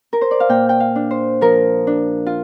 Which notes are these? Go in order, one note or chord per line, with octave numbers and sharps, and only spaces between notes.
A#4
C5
D5
F5
A#2 G5
G5
F5
D4
C5
F3 A#4
D4
F4